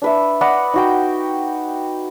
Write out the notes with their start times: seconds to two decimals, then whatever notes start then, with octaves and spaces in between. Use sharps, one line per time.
0.02 D4 B4 E5
0.41 D5 D#5 F#5 B5
0.74 D#4 F#4 G5